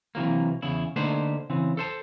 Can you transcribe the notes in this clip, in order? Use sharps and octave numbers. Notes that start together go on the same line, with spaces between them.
C3 E3 F#3 A#3
E2 C#3 E4
D3 A3 A#3 D#4 B4 C5
C#3 E3 C4
A4 C5 A5